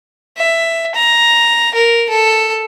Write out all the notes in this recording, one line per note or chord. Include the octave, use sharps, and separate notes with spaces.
E5
A#5
A#4
A4